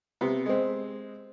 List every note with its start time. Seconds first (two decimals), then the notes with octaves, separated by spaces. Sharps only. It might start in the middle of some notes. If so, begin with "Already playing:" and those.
0.21 C3 B3
0.46 G#3 C4